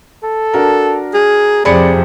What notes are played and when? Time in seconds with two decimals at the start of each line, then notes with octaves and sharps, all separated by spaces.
0.23 A4
0.54 D4 F#4 A#4
1.14 G#4
1.65 F2 C3 G#4 D5 B5 C#7